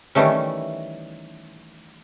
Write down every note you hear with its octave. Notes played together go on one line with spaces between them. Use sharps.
D#3 E3 G3 A3 C#4